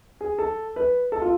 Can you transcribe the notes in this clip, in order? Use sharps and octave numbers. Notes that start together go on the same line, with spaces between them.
G#4
A4
B4
A4
F4